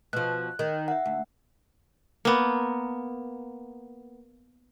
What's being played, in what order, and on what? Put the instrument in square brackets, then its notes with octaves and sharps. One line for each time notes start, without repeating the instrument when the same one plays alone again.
[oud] B2 F3 [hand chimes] F#6
[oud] D#3
[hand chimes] E5 F#5
[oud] D2
[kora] A#3 B3